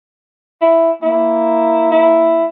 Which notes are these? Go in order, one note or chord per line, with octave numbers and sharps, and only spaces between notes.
E4
A#3 E4
E4